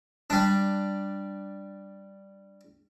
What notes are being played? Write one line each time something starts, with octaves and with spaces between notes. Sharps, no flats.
G3 D4